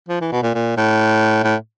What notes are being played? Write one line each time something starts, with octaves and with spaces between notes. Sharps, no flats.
F3
E3
B2
A#2
A#2
A2
A2